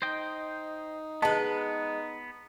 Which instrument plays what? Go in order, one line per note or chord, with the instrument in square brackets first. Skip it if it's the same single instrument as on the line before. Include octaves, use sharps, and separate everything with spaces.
[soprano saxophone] D#4 [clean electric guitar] C5 D#5 G5
[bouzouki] G#3 B4 [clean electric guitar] B3 [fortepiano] A5